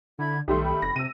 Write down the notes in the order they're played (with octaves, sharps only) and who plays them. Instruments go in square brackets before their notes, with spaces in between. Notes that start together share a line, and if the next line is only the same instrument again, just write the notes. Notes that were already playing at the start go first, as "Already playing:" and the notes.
[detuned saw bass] D3 [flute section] E4 B5 G#6
[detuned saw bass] B1 [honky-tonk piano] D#3 G3 A3 [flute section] C6
[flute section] G5 B5
[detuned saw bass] F1 [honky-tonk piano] A#6
[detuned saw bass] C3 [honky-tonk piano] E6 D#7